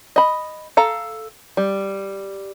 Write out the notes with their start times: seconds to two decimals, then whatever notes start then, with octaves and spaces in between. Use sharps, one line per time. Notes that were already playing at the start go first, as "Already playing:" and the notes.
0.16 D#5 B5
0.77 A4 F5 A#5
1.57 G3